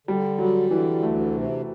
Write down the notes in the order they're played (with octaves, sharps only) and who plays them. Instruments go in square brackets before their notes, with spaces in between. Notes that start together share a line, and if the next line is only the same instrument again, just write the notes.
[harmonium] D3 [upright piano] G3
[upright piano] F#3 [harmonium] G3
[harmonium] D3 [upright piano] E3
[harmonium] D2 [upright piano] A3
[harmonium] C3